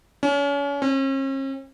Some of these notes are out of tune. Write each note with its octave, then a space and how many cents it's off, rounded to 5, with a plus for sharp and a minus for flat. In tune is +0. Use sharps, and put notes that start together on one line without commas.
C#4 +35
C#4 -45